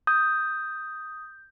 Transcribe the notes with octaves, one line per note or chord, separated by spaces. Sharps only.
D#6 G6